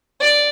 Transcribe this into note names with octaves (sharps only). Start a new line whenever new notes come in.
D5